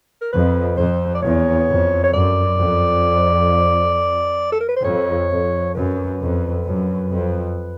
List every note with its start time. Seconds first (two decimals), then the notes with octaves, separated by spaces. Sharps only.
0.21 A#4
0.33 F2 B4
0.77 F2 C5
1.15 D5
1.22 E2 C#5
1.68 F2
2.04 C#5
2.13 F#2 D5
2.59 F2
4.52 A4
4.60 A#4
4.68 B4
4.76 C5
4.84 F2 C#5
5.29 F2
5.75 F#2 B4
6.20 F2
6.65 F#2
7.11 F2